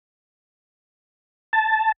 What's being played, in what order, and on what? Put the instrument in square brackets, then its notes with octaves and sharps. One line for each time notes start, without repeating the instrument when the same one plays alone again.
[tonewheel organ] A5